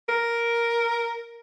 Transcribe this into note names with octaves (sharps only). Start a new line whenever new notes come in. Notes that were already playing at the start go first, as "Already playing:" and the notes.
A#4